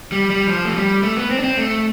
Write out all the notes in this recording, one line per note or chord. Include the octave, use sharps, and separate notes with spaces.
G3
G3
F3
A3
G3
A3
B3
C4
D4
C4
A3